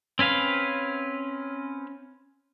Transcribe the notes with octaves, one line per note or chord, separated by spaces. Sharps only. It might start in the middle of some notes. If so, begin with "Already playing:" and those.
C4 C#4 B4 F5